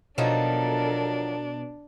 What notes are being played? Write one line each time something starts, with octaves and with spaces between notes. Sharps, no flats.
B2 F3 F#3 D4 D#4 A4 A#4